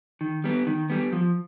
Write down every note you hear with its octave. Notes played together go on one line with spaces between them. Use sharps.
D#3
G3 B3
D#3
G3 B3
F3